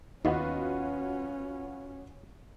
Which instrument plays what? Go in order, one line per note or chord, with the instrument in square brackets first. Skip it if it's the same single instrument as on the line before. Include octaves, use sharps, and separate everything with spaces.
[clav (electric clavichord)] D#2 B3 [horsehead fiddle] C#4 [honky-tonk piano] F4 F#4 B4 [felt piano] D#5 F#5